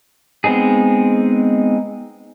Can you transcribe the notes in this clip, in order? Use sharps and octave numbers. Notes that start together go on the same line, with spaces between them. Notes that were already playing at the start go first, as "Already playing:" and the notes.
G#3 B3 C4 D#4 G#4